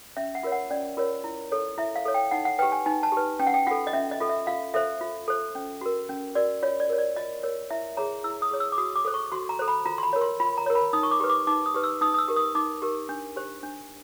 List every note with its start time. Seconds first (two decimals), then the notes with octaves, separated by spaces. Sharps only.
0.17 C#4 E5
0.35 F#5
0.43 F4 A#4 C#5
0.52 F#5
0.70 C#4 D5
0.97 F4 A#4 C#5
1.24 E4
1.52 A4 C#5
1.78 E4 E5
1.96 F5
2.05 A4 C#5
2.14 G5
2.31 D#4 F#5
2.45 F#5
2.59 G4 B4 G5
2.72 G#5
2.86 D#4 G#5
3.03 A5
3.12 G4 B4
3.39 C#4 G5
3.47 F#5
3.54 G5
3.67 F4 A4 F#5
3.87 D#5
3.93 C#4 E5
4.11 D#5
4.20 F4 A4
4.29 E5
4.47 F4 F5
4.74 A4 C5 E5
5.01 F4
5.28 A4 C5
5.55 C#4
5.81 F#4 A#4
6.09 C#4
6.35 F#4 A#4 D5
6.63 F4 C#5
6.80 D5
6.90 A#4 C#5
6.98 D5
7.16 F4 D#5
7.43 A#4 C#5
7.70 E4 E5
7.97 G#4 C#5 A#5
8.24 E4 E6
8.42 D#6
8.51 G#4 C#5
8.60 E6
8.72 D6
8.78 F#4 D#6
8.96 D6
9.05 A4 C5
9.14 C#6
9.32 F#4 C6
9.49 A#5
9.59 A4 C5
9.68 B5
9.86 F4 A#5
9.98 C6
10.03 B5
10.13 A#4 C#5
10.21 C6
10.40 F4 B5
10.58 A#5
10.66 A#4 C#5
10.75 B5
10.93 D#4 D#6
11.03 C#6
11.11 D6
11.20 G4 B4
11.29 D6
11.47 D#4 D6
11.66 D#6
11.74 G4 B4
11.84 E6
12.01 D#4 D#6
12.14 D#6
12.18 E6
12.28 G4 A#4
12.36 D#6
12.55 D#4 D6
12.82 G4 A#4
13.09 D4
13.36 G4 C5
13.63 D4